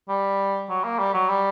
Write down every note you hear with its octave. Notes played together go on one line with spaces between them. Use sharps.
G3
F#3
A#3
G3
F#3
G3